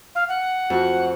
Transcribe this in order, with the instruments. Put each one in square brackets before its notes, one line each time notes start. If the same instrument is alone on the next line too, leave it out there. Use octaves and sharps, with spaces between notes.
[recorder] F5
F#5
[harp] F2 F#4